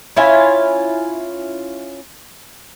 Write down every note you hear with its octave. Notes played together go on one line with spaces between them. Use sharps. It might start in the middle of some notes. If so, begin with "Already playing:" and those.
C#4 E4 F4 G#5